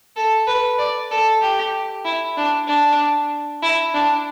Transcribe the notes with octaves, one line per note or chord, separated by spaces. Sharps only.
A4
B4
D5
A4
G4
E4
D4
D4
E4
D4